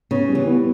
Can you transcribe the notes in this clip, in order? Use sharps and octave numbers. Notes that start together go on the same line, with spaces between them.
C#3 B3
G3
E3
B3